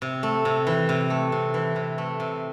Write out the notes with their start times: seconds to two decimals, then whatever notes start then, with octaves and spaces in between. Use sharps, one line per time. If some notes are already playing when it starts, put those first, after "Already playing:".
0.02 C3
0.23 A3
0.45 C3
0.67 E3
0.89 C3
1.10 A3
1.32 C3
1.54 E3
1.76 C3
1.98 A3
2.20 C3